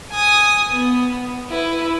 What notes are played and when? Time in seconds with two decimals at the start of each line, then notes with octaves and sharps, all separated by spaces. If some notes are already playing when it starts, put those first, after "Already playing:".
0.12 G#5 D#6
0.71 B3
1.50 E4 B4